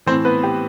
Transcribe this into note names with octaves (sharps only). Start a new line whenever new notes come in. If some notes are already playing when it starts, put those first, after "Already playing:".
A2 E3 C4 C5
B3 B4
G4